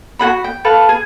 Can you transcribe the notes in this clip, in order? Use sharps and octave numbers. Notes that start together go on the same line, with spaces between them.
F#4 G#4 F#5 B5
G5
A4 B4 F5
G#4